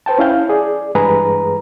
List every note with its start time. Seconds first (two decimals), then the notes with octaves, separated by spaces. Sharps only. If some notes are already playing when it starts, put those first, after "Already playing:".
0.06 B4 C5 G5 A5
0.19 C#4 E4 F5 G6
0.49 G#4 D5
0.95 G2 E3 G#3 G#4 B4 A#5